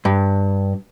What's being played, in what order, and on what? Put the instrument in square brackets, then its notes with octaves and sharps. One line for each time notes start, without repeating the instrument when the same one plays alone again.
[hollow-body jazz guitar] G2